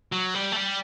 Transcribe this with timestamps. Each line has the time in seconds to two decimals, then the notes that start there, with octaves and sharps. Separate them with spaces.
0.12 F#3
0.35 G3
0.52 A3
0.56 G3